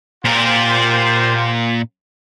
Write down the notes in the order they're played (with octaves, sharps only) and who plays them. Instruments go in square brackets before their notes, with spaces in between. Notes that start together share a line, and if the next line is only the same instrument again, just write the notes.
[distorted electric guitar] A#2 A#4 [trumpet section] F4 G4 C5